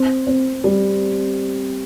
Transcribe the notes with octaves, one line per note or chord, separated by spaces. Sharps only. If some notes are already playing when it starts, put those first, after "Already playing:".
Already playing: C4
C4
G3